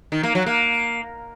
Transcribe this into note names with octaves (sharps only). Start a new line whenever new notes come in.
D#3
A#3
F#3
A#3